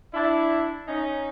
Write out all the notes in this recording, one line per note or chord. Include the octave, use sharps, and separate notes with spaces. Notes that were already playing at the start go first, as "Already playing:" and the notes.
D4 E4
C#4 D#4